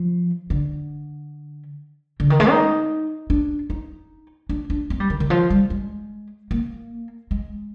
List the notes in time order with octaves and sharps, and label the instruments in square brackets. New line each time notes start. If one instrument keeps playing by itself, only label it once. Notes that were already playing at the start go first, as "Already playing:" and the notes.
Already playing: [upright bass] F3
D3
D3
D#3
G#3
D#4
D4
D#4
D4
D4
C4
G3
D#3
D#3
F3
G3
G#3
A#3
G#3